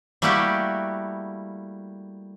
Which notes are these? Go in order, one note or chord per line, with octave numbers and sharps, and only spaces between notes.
G3 A3 A#3 E4 F#4 G4